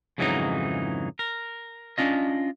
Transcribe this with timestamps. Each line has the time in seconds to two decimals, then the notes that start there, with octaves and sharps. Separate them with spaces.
0.18 F2 G#2 C#3 E3 F#3 D#4
1.19 A#4
1.98 C#4 D4 F4 D#5